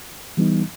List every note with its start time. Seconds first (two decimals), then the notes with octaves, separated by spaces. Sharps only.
0.37 E3 G3 B3 D#4